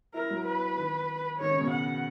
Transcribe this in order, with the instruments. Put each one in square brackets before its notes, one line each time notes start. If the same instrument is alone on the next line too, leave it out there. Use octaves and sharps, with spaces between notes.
[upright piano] E4 [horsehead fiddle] A#4
[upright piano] F#3
[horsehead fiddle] B4
[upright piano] D#3
[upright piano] D#3 [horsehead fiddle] C#5
[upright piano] C#3
B2
[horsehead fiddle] F#5